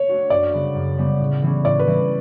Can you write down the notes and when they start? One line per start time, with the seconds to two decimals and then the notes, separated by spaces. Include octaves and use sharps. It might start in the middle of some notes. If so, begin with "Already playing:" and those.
Already playing: C#5
0.09 A3 D4 F#4
0.30 F#2 D5
0.53 C#3 G3 B3
0.75 F#2
0.98 C#3 G3 B3
1.19 A2
1.42 E3 G3 C#4
1.64 A2 D5
1.79 B4
1.87 E3 G3 C#4